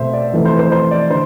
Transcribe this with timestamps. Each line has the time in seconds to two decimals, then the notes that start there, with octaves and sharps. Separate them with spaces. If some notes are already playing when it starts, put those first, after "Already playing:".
Already playing: B2 A3 C4 C5 E5
0.13 D5
0.33 F2 E3 A3 C4
0.45 C5
0.59 C5
0.72 C5
0.91 D5
1.10 D3 C5